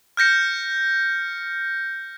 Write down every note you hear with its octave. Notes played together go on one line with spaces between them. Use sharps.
F6 G6 A#6 C#7